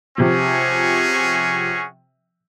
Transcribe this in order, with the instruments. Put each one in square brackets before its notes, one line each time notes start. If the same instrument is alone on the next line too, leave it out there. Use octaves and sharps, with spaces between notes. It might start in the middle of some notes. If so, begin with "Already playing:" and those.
[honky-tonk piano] C3 F3 [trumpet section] C#4 F#4 G#4